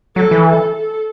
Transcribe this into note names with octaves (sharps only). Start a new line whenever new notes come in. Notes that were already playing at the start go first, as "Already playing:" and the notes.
F#3 A4
E3
A4
A4